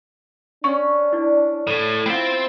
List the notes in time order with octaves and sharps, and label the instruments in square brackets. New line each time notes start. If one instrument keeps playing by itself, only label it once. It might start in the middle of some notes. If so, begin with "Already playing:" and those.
[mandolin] C#4 [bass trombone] D4 [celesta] C#6
[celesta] E4 D5
[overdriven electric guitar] A2
[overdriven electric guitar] C4 [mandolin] E4 F4